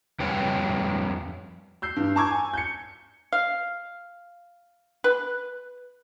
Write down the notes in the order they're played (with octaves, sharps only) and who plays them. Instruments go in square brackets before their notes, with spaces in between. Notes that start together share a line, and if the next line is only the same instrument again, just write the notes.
[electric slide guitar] F2 G3 B4 C#5 G5
[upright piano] E6 G6 C7
G2
A5 A#5 C#6 D6 E6 G#6
G#5
G6 C#7
[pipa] F5
B4